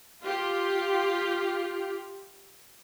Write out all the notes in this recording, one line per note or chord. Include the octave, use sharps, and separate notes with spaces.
F4 G4